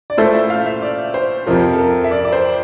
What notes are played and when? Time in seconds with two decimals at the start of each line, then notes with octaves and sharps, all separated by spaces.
0.10 D5
0.17 A#2 A3 E4 A4 C5
0.34 E5
0.50 F5
0.66 E5
0.82 D5
1.14 C5
1.46 F2 C3 F3 A#4
1.73 A4
1.79 A#4
2.04 E5
2.11 D5
2.25 D5
2.32 C5